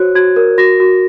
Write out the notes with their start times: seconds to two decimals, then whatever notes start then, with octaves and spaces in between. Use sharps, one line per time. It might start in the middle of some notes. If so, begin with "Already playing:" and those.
Already playing: F#4 C5 C#5 F#6
0.15 F#4 G#6
0.36 A#4
0.58 F#4 A#6
0.80 F#4